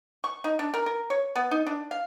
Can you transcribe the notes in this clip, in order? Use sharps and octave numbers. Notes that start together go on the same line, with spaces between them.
C#6
D#4
D4
A#4
A#4
C#5
B3
D#4
D4
F5